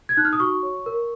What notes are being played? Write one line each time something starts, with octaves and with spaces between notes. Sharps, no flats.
G#6
D#4 F#6
F6
D#6
F#4 C#6
C#5
A#4